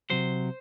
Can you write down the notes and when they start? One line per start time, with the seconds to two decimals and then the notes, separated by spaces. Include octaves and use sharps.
0.10 C3 F#3 C5